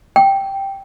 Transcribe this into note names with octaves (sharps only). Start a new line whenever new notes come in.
G5